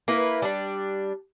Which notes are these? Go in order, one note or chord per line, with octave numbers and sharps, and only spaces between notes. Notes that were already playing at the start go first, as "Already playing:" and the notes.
A#3 E4 B4
G3 D4